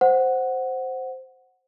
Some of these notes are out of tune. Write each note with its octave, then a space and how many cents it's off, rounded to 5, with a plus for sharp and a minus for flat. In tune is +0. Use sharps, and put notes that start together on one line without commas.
C5 +0 F#5 +0